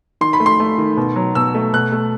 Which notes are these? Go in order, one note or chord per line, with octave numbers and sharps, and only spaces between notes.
D#3 C6
B5
A3
C6
A3
D#3
B2
F#3
B2 E6
A3
B2 F#6
A3